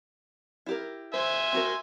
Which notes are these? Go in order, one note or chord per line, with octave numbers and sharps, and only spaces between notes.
E4 G4 A#4
C5 E5 G#5 C6
C4 F#4 A#4